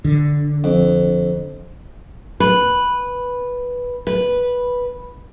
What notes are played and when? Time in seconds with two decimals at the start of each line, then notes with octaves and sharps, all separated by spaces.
0.05 D3
0.64 F2
2.40 B4
4.07 B4